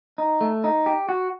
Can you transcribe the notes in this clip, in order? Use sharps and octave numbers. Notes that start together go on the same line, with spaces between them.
D#4
A3
D#4
G4
F#4